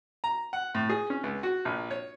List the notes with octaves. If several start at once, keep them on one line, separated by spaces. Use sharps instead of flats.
A#5
F#5
A2
G#4
C#4
C#2
F#4
A#1
C#5